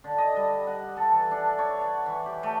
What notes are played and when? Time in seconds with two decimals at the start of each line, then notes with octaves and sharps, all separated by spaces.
0.04 D3
0.18 D#5
0.36 G3
0.67 F#5
0.97 A4
1.11 E3
1.31 D4
1.59 C#5
1.82 F#5
2.06 E3
2.26 G4
2.43 A3